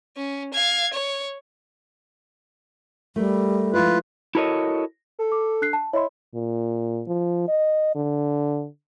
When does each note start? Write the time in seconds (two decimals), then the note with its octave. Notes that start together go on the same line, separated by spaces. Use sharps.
0.17 C#4
0.54 F5 G#6
0.93 C#5
3.16 G3 A3 A#4
3.74 F3 G#3 E4 F4 B4
4.35 E4 F#4 A4 A#4 C#5 D#5
5.19 A4
5.32 D6
5.62 D4 F#6 C7
5.73 A5
5.93 E4 C#5 D#5 C6
6.35 A#2
7.08 F3
7.48 D#5
7.95 D3